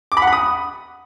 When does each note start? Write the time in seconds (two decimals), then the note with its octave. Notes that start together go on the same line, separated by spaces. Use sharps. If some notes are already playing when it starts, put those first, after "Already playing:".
0.12 D6
0.17 B5
0.22 F#5
0.27 B5
0.33 D#6